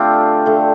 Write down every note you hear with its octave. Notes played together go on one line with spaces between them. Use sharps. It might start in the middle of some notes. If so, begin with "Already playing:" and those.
Already playing: D3 A3 C4 D4 F4 G4
D3 A3